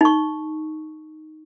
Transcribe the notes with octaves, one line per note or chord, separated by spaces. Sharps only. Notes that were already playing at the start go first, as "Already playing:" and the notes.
D#4 C#6